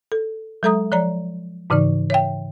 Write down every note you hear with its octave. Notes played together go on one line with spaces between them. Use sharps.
A4
F#3 G#3 A4 E5 A#5 D#6
F3 C#5 D5 A#5
G#2 C#3 E3 D#4 D5
C#5 E5 G5